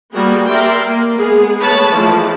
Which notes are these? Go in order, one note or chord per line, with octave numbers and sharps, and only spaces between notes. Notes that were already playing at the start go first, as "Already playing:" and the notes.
G3 A#3 B3 F#4 G#4
A#4 D5 E5 G5 C6
A#3
G#3 B3 G#4
A3 B3 B4 C#5 A5 B5
E3 F3 G#3 A3